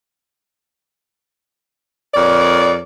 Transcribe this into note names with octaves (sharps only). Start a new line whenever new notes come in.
F2 A#4 C#5 D5